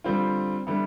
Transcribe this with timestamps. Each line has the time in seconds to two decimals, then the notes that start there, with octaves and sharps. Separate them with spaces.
0.04 D3 G3 C4 F4
0.67 D3 G3 B3 E4